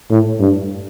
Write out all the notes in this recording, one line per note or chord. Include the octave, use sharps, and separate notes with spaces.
A2
G2